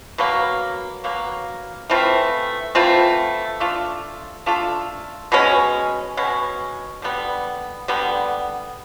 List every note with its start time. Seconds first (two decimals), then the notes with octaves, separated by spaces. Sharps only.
0.18 B2 F#3 A#3
1.04 B2 F#3 A#3
1.90 E3 A3 C4 F4
2.75 E3 A3 C4 F4
3.60 A3 D4 F4 A4
4.46 A3 D4 F4 A4
5.32 B2 G#3 C#4
6.17 B2 G#3 C#4
7.02 D3 G3 B3
7.88 D3 G3 B3